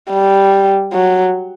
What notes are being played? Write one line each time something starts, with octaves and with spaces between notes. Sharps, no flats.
G3
F#3